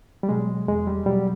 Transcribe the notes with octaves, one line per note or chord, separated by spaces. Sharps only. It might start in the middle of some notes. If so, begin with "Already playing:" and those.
G3
B2 F#3 G#3
E2 G#3
G3
B2 F#3 G3